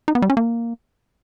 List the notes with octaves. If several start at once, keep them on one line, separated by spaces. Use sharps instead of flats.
D#4
B3
G3
C#4
A#3